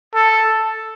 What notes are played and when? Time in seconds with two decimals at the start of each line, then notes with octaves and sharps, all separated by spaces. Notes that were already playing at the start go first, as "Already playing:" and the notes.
0.14 A4